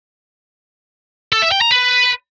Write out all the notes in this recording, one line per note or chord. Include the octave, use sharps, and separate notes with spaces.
A4
E5
G5
A#5
B4